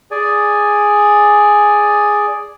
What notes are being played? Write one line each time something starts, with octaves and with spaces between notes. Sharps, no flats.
G#4 D5 G#5